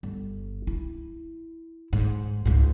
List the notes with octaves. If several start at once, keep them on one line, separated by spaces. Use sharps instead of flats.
G1
E4
G#2
C#2 G#2